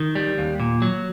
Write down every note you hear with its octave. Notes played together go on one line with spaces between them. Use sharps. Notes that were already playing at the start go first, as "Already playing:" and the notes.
Already playing: D#3
G3
D#2
A#2
F#3